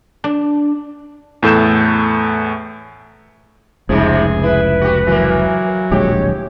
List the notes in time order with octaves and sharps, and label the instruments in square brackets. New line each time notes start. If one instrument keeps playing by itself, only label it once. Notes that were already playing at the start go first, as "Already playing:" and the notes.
[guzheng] D4
[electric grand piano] E2 A2 A4 G6 E7
[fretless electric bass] F1 C#2 [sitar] G#2 C3 F3 [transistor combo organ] G#4
[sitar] E4 [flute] B4
[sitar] F#4 G4
[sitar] E3 A#3 [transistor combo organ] F#3
[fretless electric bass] D1 A#1 G#3 [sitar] G4 [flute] C#5